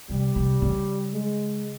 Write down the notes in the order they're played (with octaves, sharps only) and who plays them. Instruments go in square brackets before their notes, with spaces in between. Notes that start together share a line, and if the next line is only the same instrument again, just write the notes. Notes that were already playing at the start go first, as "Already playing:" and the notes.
[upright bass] C3 [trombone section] G3
[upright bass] C3
C#3
[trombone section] G#3